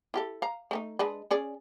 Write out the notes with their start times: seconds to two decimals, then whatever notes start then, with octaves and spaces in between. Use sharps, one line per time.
0.14 E4 G4 A4
0.42 F5 A#5
0.71 A3 C#4 D#4
0.99 G#3 D4 B4
1.31 C#4 G#4 D5